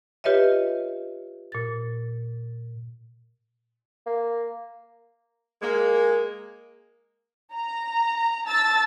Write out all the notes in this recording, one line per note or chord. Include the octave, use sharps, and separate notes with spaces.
F4 G4 B4 C#5 D#5 E5
A#2 A6
A#3
G#3 A#3
A#5
A5 E6 A6